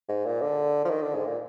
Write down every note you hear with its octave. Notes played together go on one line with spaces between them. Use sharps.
G#2
A#2
D3
F3
D#3
D3
G#2
A#2